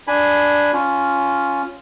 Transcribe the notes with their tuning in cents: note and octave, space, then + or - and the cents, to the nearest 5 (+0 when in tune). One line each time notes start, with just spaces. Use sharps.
D4 +0 G#5 +0 B5 +0
C#4 +10 F4 +0